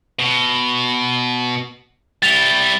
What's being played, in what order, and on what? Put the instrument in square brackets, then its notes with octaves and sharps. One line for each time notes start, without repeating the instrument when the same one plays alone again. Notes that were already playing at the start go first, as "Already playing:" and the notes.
[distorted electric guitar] B2
[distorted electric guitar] G3 E4 [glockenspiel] A6 F7 G7